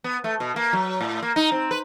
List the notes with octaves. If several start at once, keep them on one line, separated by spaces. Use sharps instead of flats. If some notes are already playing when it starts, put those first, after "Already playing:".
B3
A3
B2
A#3
F#3
A2
A#3
D#4
C4
B4